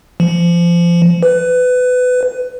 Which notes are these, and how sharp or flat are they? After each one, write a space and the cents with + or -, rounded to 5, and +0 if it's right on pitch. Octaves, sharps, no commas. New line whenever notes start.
F3 -25
B4 +20